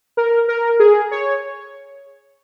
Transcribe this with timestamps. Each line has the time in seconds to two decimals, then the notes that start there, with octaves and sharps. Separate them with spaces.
0.17 A#4
0.48 A#4
0.80 G#4
1.11 C#5